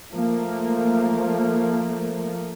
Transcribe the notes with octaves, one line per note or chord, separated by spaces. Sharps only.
F3 A3 A#3